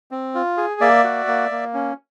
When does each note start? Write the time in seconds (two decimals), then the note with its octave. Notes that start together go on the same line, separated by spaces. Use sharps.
0.11 C4
0.35 F4
0.57 G#4
0.81 A#3 D5 E5
1.04 F#4
1.27 A#3
1.51 A#3
1.74 C#4